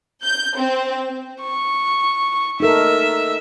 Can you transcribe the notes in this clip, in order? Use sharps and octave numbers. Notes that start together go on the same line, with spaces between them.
G6
C4
C#6
D#4 A4 A#4 E5